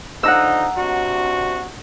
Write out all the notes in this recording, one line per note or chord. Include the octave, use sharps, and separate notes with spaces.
D3 F3 D#4 F#5 A#5 E6
C3 D4 F#4